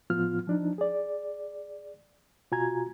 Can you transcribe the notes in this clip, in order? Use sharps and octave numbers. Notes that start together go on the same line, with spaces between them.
A2 F3 B3 F4 F6
F3 D4 D#4
G#4 D5
B2 F4 F#4 G#5 A#5 G#6